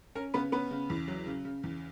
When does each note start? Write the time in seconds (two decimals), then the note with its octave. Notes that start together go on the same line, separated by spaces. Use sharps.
0.15 C#4 A#4
0.34 C#3 B3 B4
0.52 B3 C#4 B4
0.71 C#3
0.90 E2
1.08 F#3
1.26 C#3
1.45 C#3
1.63 E2